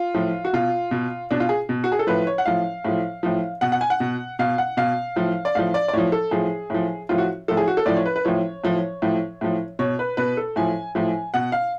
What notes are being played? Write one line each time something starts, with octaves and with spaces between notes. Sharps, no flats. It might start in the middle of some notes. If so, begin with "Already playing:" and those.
Already playing: F4
A2 F3
F#4
B2 F4
B2
B2 D4
F4
G#4
B2
F#4
G#4
A4
A2 F3 B4
C#5
F#5
A2 F3 F5
A2 F3
A2 F3
B2 F#5
F#5
G#5
F#5
B2
B2 F5
F#5
B2 F5
A2 F3
D5
A2 F3 F5
D5
D5
A2 F3 C#5
A4
A2 F3 G#4
A2 F3
A2 F3 F4
F#4
A2 F3 A4
G#4
F#4
A4
A2 F3 D5
C#5
B4
B4
A2 F3 C#5
A2 F3
A2 F3
A2 F3
B2 C#5
B4
B2 B4
A4
A2 F3 G#5
A2 F3
B2 F#5
F5